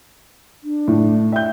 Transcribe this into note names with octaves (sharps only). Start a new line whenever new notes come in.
D4
A2
E5 G5 G6